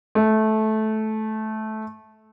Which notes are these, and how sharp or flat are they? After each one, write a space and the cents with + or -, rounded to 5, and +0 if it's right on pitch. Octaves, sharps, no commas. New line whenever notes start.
A3 -15